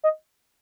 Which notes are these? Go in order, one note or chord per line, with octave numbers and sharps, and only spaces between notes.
D#5